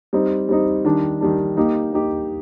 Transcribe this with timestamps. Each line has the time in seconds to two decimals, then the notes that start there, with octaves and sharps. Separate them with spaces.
0.13 G3 C4 D#4
0.49 G3 C4 D#4
0.85 D#3 G3 D4
1.21 D#3 G3 D4
1.57 A#3 D#4 G4
1.92 A#3 D#4 G4